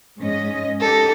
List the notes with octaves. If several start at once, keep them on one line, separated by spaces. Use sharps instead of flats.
G#2 C#4 D#5
D#4 G4 A4